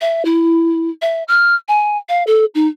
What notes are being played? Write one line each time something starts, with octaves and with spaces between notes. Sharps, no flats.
E5
E4
E5
F6
G#5
F5
A4
D#4